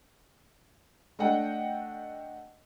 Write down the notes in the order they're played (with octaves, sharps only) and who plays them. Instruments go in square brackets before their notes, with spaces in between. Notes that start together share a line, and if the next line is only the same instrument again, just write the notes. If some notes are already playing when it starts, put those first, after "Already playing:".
[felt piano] A3 D4 D#5 F#5 G5